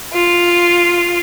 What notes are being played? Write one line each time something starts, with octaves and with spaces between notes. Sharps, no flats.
F4